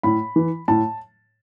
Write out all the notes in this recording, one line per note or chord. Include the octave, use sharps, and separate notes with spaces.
A2 B5
E3
A2 A5